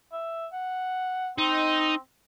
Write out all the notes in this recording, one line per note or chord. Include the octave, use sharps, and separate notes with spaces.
E5
F#5
C4 D#4